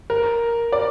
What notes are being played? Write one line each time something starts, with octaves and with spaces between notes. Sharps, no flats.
A#4
D5